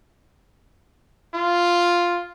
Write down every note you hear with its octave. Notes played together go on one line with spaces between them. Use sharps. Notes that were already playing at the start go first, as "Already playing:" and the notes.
F4